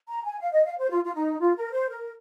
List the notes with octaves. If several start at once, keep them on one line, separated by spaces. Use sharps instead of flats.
A#5
G#5
F5
D#5
F5
C5
F4
F4
D#4
F4
A#4
C5
A#4